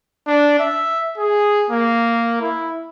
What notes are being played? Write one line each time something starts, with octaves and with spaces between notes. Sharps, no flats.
D4
E5
G#4
A#3
E4